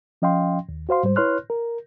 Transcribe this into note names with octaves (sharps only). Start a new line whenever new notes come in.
F3 C#4 D#5 F5 G5 C6
D#2
F#4 C5 F5 C6
G#2 G3 C5
E4 B4 C#5 C6 F6 F#6
A#4